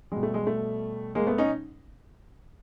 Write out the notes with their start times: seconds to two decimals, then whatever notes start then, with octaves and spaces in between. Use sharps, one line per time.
0.12 B2 G3 G#3
0.23 A3
0.34 G#3
0.47 A3
1.15 G#3 A#3
1.27 A3 B3
1.38 C#4 D#4